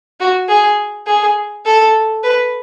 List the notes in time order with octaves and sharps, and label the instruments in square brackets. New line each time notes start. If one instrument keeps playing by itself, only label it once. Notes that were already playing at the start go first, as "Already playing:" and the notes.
[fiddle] F#4
G#4
G#4
A4
B4